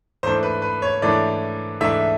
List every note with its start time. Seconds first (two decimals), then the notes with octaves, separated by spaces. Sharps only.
0.23 G#2 E3 A3 D4 C5
0.43 B4
0.62 B4
0.82 C#5
1.02 G#2 E3 A3 D4 D5
1.81 G#2 E3 A3 D4 E5